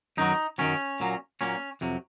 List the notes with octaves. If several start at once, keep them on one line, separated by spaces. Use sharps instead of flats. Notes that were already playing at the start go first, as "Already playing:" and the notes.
F#2 D#3 F#3 D#4
F#2 D#3 F#3 C#4
A#2 F#3 A#3
A#2 F#3 A#3 C#4
F2 C3 F#3